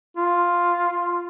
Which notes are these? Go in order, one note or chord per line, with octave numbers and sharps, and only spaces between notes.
F4